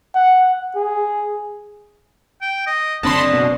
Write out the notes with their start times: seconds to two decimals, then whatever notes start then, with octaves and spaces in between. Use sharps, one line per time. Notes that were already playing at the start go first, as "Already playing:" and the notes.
0.15 F#5
0.76 G#4
2.42 G5
2.66 D#5
3.03 F#1 D3 C4 D4 D#5 A5 B5 C6
3.34 B2